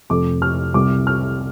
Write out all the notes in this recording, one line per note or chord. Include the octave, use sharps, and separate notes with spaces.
F1 F2 C3 D6
F6
C2 C3 D6
F6